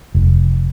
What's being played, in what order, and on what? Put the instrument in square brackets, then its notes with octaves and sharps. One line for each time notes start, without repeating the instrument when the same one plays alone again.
[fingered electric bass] F1